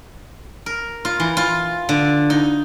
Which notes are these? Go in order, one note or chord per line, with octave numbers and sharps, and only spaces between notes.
A#4
F4
E3
F4
D3
D#4